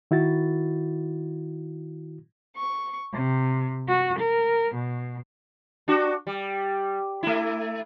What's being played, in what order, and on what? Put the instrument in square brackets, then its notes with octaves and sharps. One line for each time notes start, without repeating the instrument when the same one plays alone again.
[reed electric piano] D#3 E4 F#4 A6
[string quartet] C#6
C3
F#4
A#4
B2
[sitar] D4 F#4
G3
A3 E4